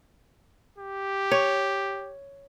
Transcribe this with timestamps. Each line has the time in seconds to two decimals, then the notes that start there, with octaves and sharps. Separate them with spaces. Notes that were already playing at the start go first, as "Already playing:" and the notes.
0.79 G4
1.31 C#5